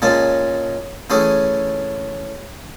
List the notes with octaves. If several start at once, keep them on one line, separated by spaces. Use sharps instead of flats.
A#2 G#3 C#4 A5
E3 A3 C#4 G#4